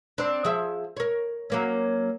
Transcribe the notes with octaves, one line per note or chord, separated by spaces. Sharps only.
C4 D4
F3 G#4 E5
A#4 C#5
F#3 A#3 C#4